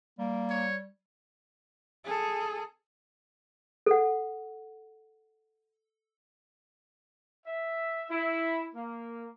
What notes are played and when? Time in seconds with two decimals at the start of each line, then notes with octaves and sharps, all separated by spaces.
0.19 G3 A#3
0.50 C#5
2.05 G#4 A4
3.86 A4 F#5
7.47 E5
8.10 E4
8.75 A#3